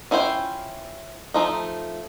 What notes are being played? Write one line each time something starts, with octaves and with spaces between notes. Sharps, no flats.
C#4 E4 F4 C5 G5
F3 A3 D#4